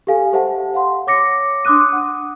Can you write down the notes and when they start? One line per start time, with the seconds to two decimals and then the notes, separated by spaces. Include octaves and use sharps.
0.07 G4 A4 F5 G#5
0.33 G4 C5 E5 F#5 A5
0.74 F5 F#5 C6
1.07 C#5 D6 A#6 C#7
1.65 D4 C6 D6 D#6 F#6 D#7
1.93 F#5